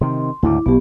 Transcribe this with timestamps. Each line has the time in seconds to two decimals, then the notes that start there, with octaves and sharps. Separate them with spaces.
0.01 C3 D#3 C6
0.43 D2 G#2 C#3 E4 D6
0.66 B1 B2 B3 G4